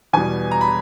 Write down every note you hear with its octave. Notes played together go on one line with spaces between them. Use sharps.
E2 B2 G3 B3 G#5
A#5
B5